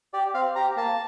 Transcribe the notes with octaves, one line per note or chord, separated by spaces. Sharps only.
G4 D5
C4 F5
G4 A#5
A#3 A5